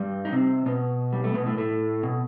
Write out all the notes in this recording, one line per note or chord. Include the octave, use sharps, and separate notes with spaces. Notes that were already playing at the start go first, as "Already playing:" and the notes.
Already playing: G2 G3
D#4
C3 C4
B2 B3
G3
A3
B2 B3
A2 A3
A2 A3
B2